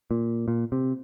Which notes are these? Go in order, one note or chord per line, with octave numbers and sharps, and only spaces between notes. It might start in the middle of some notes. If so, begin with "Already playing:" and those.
A#2
A#2
C3